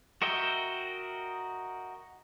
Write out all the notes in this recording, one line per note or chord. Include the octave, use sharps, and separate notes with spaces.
F#4 A#4 D#5 E5 G5